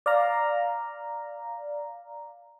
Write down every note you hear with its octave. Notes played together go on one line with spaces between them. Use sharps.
D5 F5 A#5